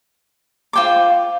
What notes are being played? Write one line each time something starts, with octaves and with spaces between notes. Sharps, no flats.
F4 C5 G5 D6